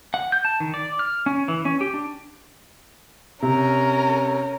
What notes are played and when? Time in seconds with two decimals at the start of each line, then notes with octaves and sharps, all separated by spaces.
0.14 F#5
0.32 G6
0.45 A5
0.60 D#3
0.74 D5
0.99 F6
1.26 C#4
1.48 E3
1.65 C#4
1.81 G4
1.94 D4
3.42 C3 C#4 A#4